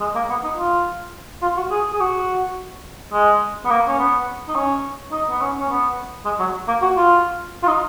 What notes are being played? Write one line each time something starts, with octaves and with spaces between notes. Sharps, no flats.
G#3
A#3
B3
D#4
F4
F4
F#4
G#4
G#4
F#4
G#3
B3
A#3
C#4
B3
D#4
C#4
D#4
B3
C#4
C#4
B3
G#3
F#3
A#3
F#4
F4
F4
D#4